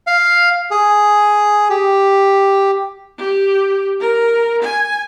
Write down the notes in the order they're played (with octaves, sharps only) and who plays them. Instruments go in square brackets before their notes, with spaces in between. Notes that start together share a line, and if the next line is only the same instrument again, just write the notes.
[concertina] F5
G#4
G4
[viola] G4
A#4
G#5